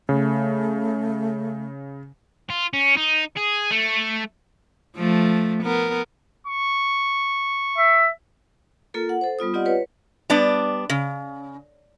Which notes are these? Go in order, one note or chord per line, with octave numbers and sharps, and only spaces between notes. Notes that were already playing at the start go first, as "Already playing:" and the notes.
C#3 A3
F4
C#4
D#4
G#4
A3
F3 A3
B3 A#4
C#6
E5
A#3 F4 A4 A#4
F#5
A4 C5
G3 B3 F4 D#6
C4 F4 G4 D5 D#5 F#5
B4 C#5
G3 B3 D4 D5
C#3